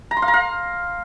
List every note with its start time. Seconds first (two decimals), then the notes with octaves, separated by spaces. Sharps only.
0.11 A#5
0.17 C6
0.22 F5
0.28 A#5
0.34 F5